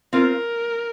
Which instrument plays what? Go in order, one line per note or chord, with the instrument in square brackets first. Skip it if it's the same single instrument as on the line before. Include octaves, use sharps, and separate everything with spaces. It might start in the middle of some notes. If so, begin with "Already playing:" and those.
[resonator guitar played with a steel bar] C4 F4 C5 [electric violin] A#4